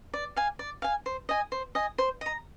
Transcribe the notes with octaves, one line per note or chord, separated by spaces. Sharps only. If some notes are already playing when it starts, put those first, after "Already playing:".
D5
F5 G#5
D5
F5 G#5
C5
D#5 G#5
C5
D#5 G#5
C5
D#5 A#5